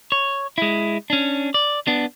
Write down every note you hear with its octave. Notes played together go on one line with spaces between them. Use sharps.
C#5
G#3 E4
C#4 D4
D5
B3 D4